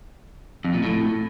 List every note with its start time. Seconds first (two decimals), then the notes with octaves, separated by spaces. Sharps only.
0.65 F2
0.74 A#2
0.83 A2